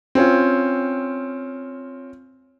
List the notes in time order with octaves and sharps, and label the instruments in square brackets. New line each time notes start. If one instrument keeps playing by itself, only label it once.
[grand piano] C4 C#4 F4